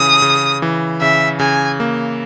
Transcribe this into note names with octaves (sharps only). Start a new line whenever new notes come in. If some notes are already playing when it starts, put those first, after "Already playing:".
Already playing: C#3 E3 D#6
C#3
E3
C#3 E5
C#3 G#5
A#3